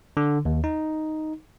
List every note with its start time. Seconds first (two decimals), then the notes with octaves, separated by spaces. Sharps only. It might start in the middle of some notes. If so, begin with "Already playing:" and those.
0.17 D3
0.45 D#2
0.64 D#4